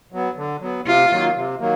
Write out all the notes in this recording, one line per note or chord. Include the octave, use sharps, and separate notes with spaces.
F#3 B3
D3
F#3 B3
C3 F4
D#3 F#3 A#3
C3
D#3 F#3 A#3